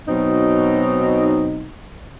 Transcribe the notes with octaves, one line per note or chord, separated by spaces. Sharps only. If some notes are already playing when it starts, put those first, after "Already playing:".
B2 F#3 C4 D#4